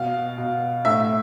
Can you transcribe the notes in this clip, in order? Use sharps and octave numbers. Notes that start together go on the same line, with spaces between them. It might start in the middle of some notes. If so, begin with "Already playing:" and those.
Already playing: B2 F5
B2
A2 E5